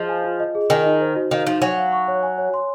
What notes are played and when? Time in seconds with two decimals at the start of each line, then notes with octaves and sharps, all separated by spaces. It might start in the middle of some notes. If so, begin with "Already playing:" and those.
Already playing: F3 G#4 C5 D#5
0.09 G#5
0.24 F4
0.40 D#5
0.55 G#4
0.70 D#3 G#5
0.85 D#4
1.01 C5
1.16 F#4
1.31 D#3 F5
1.47 F3 D#4
1.62 F#3 G#5
1.78 F5
1.92 C#6
2.08 C#5
2.23 G#5
2.38 C#5
2.54 C6